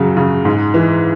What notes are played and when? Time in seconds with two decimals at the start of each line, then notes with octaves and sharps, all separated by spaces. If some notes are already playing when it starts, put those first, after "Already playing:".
Already playing: F#2 C#3 F#3
0.17 C#3
0.45 G#2
0.74 E3